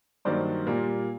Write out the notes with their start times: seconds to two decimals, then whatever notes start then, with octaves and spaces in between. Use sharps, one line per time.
0.25 G2 D#3 F#3 A#3 C5 D5
0.67 A#2 G3 A#3